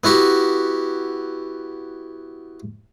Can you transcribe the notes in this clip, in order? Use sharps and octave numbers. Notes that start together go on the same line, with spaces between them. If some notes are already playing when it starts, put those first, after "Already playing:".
B3 E4 F#4 G4